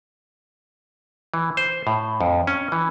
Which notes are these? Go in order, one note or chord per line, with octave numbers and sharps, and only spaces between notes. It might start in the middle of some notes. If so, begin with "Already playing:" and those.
E3
C5
A2
F2
C#4
E3